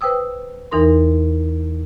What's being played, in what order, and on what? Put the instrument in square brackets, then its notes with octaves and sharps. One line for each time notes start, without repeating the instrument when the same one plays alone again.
[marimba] B4 C5 G5 D#6 E6
E2 E3 D#4 A#4 C6